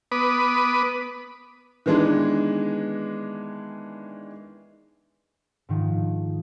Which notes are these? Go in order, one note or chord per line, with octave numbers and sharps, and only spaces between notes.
B3 B4 D6 D#6
D#3 E3 G#3 B3 D4
G#2 D#3 F3